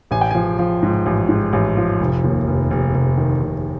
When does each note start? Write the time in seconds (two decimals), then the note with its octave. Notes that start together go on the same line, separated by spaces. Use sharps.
0.11 A1 G#5
0.21 G5
0.31 F3 G#5
0.59 F3
0.83 G#2
1.06 A1
1.29 G#2
1.53 A1
1.77 F3
2.00 F1
2.24 D#2
2.47 F1
2.71 F1
2.94 F1
3.17 D#3
3.42 F1